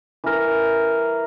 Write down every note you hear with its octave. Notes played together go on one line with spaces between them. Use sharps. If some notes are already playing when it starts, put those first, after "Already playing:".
E3 A#4